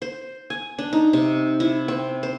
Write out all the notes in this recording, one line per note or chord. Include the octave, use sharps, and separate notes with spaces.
C5
G#5
D4
D#4
C3
E4
C4
C5